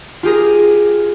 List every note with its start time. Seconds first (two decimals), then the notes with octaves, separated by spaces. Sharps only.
0.23 F4 G4 G#4 A#4